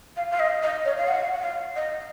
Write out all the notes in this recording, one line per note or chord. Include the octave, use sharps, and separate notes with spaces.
F5
F5
D#5
D#5
C#5
F5
F#5
F#5
F5
D#5